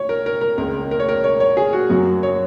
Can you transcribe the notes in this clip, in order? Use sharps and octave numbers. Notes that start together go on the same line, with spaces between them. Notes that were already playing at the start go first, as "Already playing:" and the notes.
Already playing: C#5
A#4
A#4
A#4
C#2 C#3 A#3 A#4
A#4
C#5
A#4
C#5
C#5
G#4
F#4
F#2 F#3 A#3 F#4
C#5